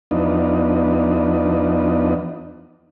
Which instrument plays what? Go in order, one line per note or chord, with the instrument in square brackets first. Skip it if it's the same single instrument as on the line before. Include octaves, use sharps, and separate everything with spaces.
[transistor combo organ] E2 F3 B3 D4 D#4